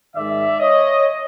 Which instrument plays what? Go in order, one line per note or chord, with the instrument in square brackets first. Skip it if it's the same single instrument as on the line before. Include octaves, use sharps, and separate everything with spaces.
[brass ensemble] G#2 D#3 G#3 D5 E5
C#5 D#5